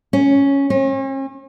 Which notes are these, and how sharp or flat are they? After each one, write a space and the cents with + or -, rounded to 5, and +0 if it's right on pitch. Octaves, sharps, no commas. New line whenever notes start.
C#4 +0
C#4 -45